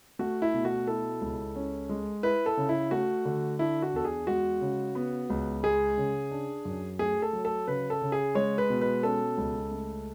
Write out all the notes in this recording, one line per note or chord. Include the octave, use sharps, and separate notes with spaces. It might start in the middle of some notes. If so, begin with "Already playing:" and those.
A3 F#4
E4
B2
F#4
E4 A4
C#2
C#4
G#3
E4 B4
A4
C#3
E4
A3 F#4
D3
D4 E4
F#4
E2 A4
G#4
G#3 F#4
C#3
B3
C#2
G#3 G#4
C#3
D4
F#2
A3 G#4
A4
F#3
A4
C#3 B4
A4
C#3
G#4
G#3 C#5
B4
B2
B4
C#4 A4
C#2
A3